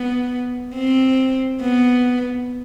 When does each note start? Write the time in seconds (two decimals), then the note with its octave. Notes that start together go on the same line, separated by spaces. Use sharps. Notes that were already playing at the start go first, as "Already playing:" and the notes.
Already playing: B3
0.75 C4
1.61 B3